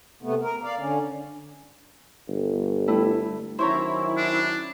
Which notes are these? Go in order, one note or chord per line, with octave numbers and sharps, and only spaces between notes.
C3 A3 B3
A#4
D5 F5
D3 C#4
G1
G3 A3 E4
D#3 F#3 C#4 E4 C5 C#5 A#5
D4